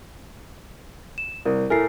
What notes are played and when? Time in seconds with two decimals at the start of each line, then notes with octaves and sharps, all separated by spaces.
1.18 E7
1.45 C2 A#4
1.70 A2 A3 A#4 G#5 C7